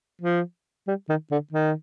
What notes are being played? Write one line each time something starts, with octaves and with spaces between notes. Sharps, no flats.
F3
G3
D#3
D3
D#3